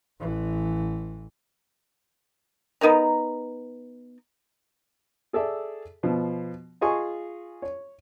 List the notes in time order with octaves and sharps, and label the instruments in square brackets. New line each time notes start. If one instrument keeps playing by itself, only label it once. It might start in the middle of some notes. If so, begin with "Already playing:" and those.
[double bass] A1 E3
[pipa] B3 D#4 A#4 A#5
[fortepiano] G#4 A4 D5 E5
B2 F3
F4 G#4 D#5 G#5 C6 C#6
C#5